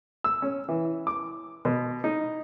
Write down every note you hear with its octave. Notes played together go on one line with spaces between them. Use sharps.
E6
C#4
E3
D6
B2
D#4